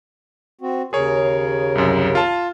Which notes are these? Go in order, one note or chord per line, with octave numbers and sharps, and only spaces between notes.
C4 F#4
D#2 C#3 G#4 A#4 C#5
C2 F#2
F4 A5